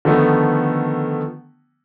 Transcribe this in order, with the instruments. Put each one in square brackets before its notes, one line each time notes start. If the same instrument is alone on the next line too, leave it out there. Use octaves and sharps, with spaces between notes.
[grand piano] D3 D#3 F3 A3 B3